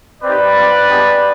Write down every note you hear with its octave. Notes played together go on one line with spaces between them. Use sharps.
C4 D#4 G4 B4 D5
C4 F4
G#3 B3 D4 G4